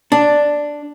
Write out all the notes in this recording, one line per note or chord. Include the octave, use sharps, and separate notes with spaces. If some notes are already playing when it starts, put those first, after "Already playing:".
D4